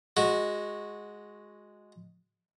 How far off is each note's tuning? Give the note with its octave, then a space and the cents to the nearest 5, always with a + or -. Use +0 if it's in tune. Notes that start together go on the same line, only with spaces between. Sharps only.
G#3 +0 F#4 -15